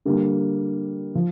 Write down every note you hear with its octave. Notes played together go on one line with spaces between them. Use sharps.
D3 G3 A#3
F3